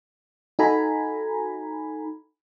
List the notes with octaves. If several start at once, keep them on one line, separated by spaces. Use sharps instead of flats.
D#4 F#4 A4 G#5 A#5 B5